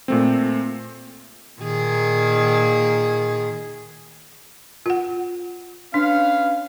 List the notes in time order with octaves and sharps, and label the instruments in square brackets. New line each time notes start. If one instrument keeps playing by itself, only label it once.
[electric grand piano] A#2 A3 C4
[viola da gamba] A#2 D#3 G#4
[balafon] F4 F#5
[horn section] C#4 B4 F5 [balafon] D4